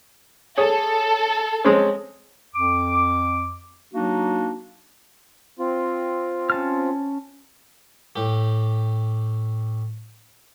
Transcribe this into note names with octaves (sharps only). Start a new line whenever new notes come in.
G#4 A4 C#5
G#3 C4 C#4
F2 D6
F#3 A#3 D4 D#4 F#4
C4 F4
C#4 A5 F6
A2 G4